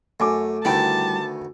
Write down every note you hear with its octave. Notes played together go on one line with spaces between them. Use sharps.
F#2 A3 G#5 D6
D2 D#3 G3 B3 E4 G5 A5